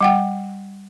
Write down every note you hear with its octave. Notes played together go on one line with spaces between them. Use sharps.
G3 F#5 G5